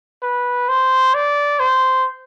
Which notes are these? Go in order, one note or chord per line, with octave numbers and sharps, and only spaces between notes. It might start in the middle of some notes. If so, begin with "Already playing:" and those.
B4
C5
D5
C5